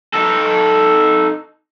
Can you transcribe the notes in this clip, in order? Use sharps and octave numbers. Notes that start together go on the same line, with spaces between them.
D#4 A4